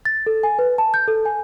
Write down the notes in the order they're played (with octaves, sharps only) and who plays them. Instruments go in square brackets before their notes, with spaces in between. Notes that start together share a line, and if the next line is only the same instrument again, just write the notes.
[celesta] A6
A4
G#5
B4
A5
G6
A4
G#5